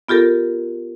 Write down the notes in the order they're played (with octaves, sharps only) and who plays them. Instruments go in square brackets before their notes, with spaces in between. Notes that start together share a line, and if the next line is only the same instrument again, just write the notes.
[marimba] B3 F4 G4 A4 A#4